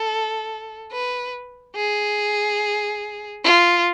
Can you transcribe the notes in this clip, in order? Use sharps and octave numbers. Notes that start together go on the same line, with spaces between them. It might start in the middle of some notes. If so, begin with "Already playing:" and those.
Already playing: A4
B4
G#4
F4